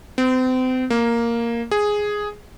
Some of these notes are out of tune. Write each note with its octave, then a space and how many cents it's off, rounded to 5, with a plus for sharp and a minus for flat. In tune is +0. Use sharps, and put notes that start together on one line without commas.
C4 -35
A#3 +0
G#4 +0